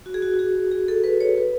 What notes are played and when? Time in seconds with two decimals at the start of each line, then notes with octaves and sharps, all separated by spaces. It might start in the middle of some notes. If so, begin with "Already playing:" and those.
0.06 F#4
0.14 G#4
0.22 F#4
0.33 F#4
0.39 G#4
0.72 G#4
0.88 A4
1.04 B4
1.20 C#5
1.38 B4